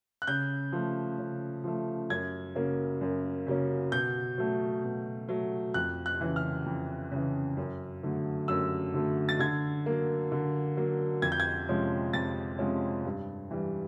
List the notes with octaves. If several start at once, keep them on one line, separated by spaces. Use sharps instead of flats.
F#6
C#3 G6
F3 A3
C#3
F3 A3
F#2 G#6
C#3 F#3 A#3 C#4
F#2
C#3 F#3 A#3 C#4
B2 G6
F#3 A3
B2
F#3 A3
F2 F#6
F#6
C#3 E3
F6
F2
C#3 E3
F#2
D3 F#3 A3
F#2 E6
D3 F#3 A3
A6
D3 G#6
F#3 A#3
D3
F#3 A#3
F2 G#6
G6
G#6
C3 F3 G#3 C#4
F2 A6
C3 F3 G#3 C#4
G2
E3 G3